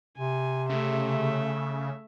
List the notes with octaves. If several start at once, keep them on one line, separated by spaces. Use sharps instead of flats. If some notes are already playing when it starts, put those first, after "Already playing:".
C3 G#5
C#3 A3 E5